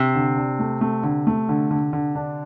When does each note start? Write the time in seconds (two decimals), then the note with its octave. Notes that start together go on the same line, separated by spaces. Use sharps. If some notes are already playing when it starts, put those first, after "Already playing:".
Already playing: C3
0.15 D3
0.36 D4
0.59 A3
0.81 A3
1.03 D3
1.27 A3
1.49 D3
1.71 D3
1.93 D3
2.15 D4